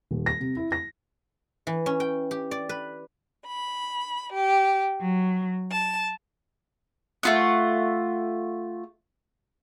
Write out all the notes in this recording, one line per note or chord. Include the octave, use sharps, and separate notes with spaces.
D#1
A#6
C3
E4
A#6
E3
C#4
G5
G4
D5
B4
B5
G4
F#3
A5
A3 F4 F#5